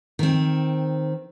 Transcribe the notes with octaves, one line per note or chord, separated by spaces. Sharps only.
D#3 C4